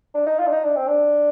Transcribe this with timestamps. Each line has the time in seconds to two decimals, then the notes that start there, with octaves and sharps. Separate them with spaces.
0.14 D4
0.26 D#4
0.39 F4
0.47 D4
0.51 D#4
0.64 D4
0.76 C4
0.88 D4